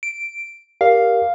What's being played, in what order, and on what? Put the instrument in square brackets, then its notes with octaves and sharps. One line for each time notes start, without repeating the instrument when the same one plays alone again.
[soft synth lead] D7
[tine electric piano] G4 A#4 D5 [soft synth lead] F5